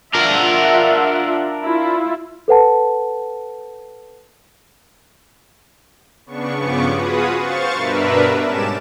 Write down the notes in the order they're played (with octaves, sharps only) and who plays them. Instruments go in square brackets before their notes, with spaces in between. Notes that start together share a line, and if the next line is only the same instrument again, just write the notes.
[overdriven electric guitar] D4 A#4 [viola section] F4 E5 F#5
[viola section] E4 F4
[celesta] A4 B4 F#5 A5
[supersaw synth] C#3 B3 D4 C#6
G2 C#3 F3 B3 C#6 D6
F4 F#4 G#4 B4 D#6
C5 F5 C#6 A6
G2 B2 D4 A#4 B4 E5
G#2 G3 C#4 A5 D6 E7